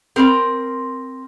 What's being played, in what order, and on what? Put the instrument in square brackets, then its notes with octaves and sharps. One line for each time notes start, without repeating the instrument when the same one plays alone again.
[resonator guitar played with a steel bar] C4 A#4